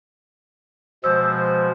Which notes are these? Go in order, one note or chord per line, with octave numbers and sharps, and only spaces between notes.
B2 F3 G#3 C5 E6